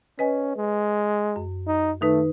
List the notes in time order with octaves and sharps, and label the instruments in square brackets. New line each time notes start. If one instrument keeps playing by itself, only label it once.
[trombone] C#4 [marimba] B4 D#5 G#5
[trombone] G#3
[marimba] F#2
[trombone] D#4
[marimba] D#3 D#4 B4 [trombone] A3